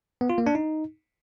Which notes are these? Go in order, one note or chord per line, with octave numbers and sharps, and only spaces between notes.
B3
F4
A#3
D4
D#4